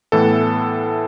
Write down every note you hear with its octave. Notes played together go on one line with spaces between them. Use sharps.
A2 E3 B3 A4